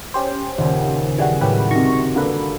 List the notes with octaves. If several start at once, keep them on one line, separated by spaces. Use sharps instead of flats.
C#4 G4 C5
D#1 C#3
E3 G3 F#4 G#4
A2 F#3 G3 F#4 G4 B4
C3 D#3 C#6 A#6
D3 A#3 B4